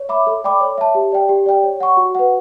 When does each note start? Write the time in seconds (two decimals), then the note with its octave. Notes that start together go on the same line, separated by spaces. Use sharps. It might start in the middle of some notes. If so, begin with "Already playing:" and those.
Already playing: C#5
0.09 E5 B5 D6
0.27 A4
0.44 D5 G5 B5 D6
0.61 C#5
0.78 E5 A5
0.95 G4
1.12 D5 G5
1.29 G4
1.46 D5 G5
1.63 C#5
1.80 F#5 C#6
1.97 F#4
2.15 B4 F#5